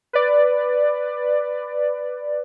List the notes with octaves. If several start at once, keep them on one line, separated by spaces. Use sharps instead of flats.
B4 D5